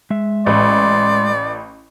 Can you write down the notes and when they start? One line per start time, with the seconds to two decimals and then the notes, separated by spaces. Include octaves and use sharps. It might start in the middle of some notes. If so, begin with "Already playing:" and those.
0.10 G#3 E5
0.46 A1 D5 C6